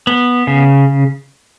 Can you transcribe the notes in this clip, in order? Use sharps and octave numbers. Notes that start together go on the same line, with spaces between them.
B3
C#3